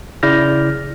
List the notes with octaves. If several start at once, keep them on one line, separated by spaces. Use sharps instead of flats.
C#3 E4 D5 F6 G6 A#6